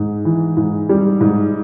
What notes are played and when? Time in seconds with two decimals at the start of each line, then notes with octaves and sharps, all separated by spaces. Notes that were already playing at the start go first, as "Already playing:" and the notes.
Already playing: G#2
0.25 E3
0.57 G#2
0.89 G3
1.21 G#2